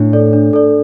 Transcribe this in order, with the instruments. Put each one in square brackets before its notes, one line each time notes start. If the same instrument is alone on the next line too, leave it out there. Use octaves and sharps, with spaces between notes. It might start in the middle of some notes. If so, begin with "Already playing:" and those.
Already playing: [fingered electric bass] A2 [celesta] D4
[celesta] A4 D5
D4
A4 D5